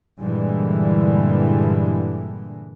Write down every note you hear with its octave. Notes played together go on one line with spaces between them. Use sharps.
G2 A#2 D3 E3 G3 G#3